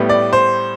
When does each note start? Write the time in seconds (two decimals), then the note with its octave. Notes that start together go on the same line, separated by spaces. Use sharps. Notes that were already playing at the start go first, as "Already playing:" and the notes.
Already playing: A2 G3 B3
0.09 D5
0.33 C5